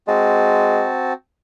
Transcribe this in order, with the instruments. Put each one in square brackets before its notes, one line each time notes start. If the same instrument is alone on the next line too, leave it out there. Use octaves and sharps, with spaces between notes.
[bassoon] G#3 [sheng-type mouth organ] C4 F#4 A5